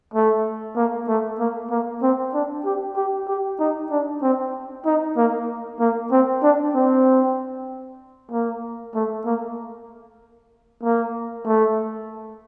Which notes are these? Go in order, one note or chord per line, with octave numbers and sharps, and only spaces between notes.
A3
A#3
A3
A#3
A#3
C4
D4
G4
G4
G4
D#4
D4
C4
D#4
A#3
A#3
C4
D4
C4
A#3
A3
A#3
A#3
A3